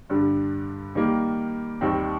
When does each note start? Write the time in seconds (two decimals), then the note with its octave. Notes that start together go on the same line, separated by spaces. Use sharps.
0.10 G2 D3 G3
0.95 D#3 G3 A#3
1.81 D#2 D#3 G3 C4